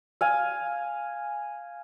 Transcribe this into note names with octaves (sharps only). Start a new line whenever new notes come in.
F5 G#5